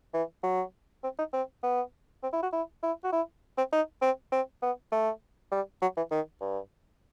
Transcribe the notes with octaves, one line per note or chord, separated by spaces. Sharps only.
E3
F#3
C4
D#4
C4
B3
C4
E4
F#4
E4
E4
F#4
E4
C4
D#4
C4
C4
B3
A3
G3
F#3
E3
D#3
G2